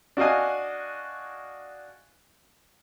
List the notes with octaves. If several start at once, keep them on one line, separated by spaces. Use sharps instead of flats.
D4 F#4 D#5 F5 G#5